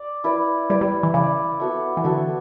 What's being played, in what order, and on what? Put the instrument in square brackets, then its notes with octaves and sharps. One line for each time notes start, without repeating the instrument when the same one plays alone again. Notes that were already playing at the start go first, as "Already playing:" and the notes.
Already playing: [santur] D5
E4 B4 D5
[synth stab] G3 [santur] E4 B4 D5
[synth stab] G3
E3
[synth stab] C#3 [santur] E4 B4 D5
[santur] B3 F#4 A4 E5
[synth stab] E3
[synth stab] D3 [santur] B3 F#4 A4 E5